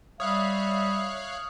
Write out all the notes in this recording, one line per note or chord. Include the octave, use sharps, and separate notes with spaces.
G3 C#5 E5 F5 D#6 F#6